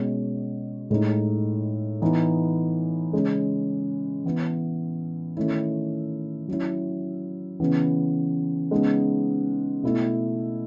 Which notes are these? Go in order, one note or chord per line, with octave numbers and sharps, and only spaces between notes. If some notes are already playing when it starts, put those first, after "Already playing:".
Already playing: B2 G#3 C#4
A2 G#3 D#4
E3 B3 D#4
C#3 G#3 C#4
E3 B3 E4
D#3 A3 C#4 E4
F#3 C#4 E4
C#3 E3 B3
C#3 G#3 B3 D#4
B2 A3 E4